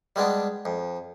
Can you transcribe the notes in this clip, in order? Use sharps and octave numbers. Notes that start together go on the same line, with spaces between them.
G3 G#3 B3 D4
F2